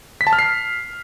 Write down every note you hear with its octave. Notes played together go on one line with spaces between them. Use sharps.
B6
A5
F6
C7